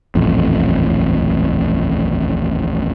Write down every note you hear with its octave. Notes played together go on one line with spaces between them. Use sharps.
D#1 A1 F2